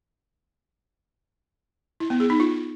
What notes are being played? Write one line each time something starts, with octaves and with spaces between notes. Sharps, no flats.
E4
B3
G#4
D#4
F4